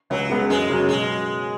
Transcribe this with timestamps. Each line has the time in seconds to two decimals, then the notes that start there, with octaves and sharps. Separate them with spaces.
0.10 C#2 F#3
0.29 C#3 G#3 B3
0.49 F#2 G#3
0.70 C#3 F#3
0.88 B2 G#3